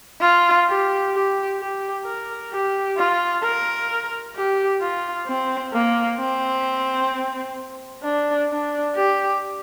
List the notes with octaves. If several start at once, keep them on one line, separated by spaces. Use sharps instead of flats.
F4
G4
G4
G4
A#4
G4
F4
A#4
G4
F4
C4
A#3
C4
D4
D4
G4